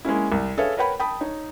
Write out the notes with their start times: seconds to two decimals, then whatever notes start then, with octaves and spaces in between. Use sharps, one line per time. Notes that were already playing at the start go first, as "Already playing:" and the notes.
0.05 G#3 A#3 C#4 E4
0.32 C2
0.57 G#4 A4 B4 C#5 E5 F5
0.77 A#4 B4 C#5 F#5 G5 B5
1.00 G5 A5 B5 D#6
1.21 D#4 C#5